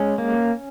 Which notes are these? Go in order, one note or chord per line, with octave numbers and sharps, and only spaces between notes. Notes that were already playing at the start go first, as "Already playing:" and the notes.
Already playing: G#3 C#4
A#3